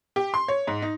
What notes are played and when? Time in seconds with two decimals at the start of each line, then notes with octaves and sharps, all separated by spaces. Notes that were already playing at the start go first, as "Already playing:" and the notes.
0.16 G4
0.34 C6
0.48 C#5
0.67 G#2
0.82 D#4